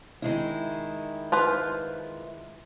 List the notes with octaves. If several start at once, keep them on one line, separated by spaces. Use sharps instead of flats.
D#3 G#3 E4
F4 B4 C5